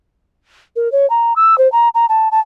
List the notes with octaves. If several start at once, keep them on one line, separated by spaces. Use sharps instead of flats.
A#4
C#5
A#5
E6
C5
A#5
A#5
A5
A5